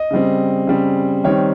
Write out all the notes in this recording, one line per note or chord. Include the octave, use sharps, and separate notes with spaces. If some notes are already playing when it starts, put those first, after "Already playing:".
Already playing: D#5
C#3 G3 C4
C#3 G3 C4
D#3 G3 C4 D#4 C#5